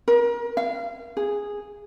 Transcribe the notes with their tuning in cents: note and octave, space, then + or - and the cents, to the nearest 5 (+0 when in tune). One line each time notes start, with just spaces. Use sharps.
A#4 +35
F5 -30
G#4 -10